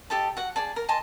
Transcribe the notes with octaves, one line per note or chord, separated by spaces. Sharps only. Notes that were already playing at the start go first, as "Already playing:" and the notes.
G4 A4 D#5 A5
F#4 F#5
G#4 D5 A5
A#4
D#5 G#5 A5 C6